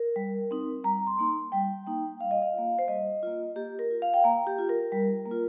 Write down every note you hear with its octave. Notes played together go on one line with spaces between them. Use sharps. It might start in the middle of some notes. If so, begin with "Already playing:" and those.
Already playing: A#4
G3
C4 D#4
G3 A#5
C6
A#3 D#4
G3 G5
A#3 D#4
G3 F5
D#5
F5
A#3 F4
C5
G3 D#5
A#3 F4
A#3 G4
A#4
F4
F5
G5
A#3 A#5
G4
F4
A#4
G3
A#3
F4